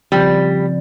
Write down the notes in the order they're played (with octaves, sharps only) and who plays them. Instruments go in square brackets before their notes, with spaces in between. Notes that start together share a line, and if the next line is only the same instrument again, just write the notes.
[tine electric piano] C#3 F3 C4 [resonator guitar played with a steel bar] G3